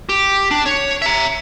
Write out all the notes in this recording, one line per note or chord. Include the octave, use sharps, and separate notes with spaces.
G4
D4
C#5
E5 A#5